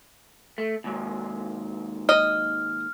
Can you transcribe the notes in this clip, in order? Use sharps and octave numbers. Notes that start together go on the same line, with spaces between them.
A3
D#2 G#2 F#3
D#5 F6